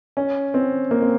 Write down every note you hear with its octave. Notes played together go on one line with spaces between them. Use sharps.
C#4
C4
A#3
C4